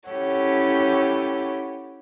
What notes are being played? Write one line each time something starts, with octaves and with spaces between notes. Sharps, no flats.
C#4 E4 G4 A4 C#5 F#5